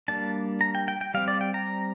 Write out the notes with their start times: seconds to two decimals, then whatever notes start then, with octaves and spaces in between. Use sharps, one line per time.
0.08 G3 A#3 D4 A5
0.61 A#5
0.75 G5
0.88 G5
1.01 G5
1.14 G3 C4 F5
1.28 D5
1.41 G5
1.54 A#5